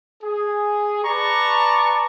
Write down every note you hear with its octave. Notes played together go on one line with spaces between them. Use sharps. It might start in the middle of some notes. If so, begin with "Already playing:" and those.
G#4
B4 D5 A5 A#5 C#6